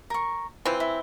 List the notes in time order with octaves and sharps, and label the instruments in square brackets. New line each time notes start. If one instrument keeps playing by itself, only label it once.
[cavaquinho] A#4 C#6
[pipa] E3 C4 [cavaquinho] F4
[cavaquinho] E4